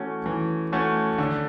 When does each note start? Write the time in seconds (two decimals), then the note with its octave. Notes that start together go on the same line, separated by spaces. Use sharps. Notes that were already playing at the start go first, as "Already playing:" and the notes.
Already playing: E3 A3 C#4 F#4
0.26 E3
0.72 A3 C#4 F#4
1.18 D3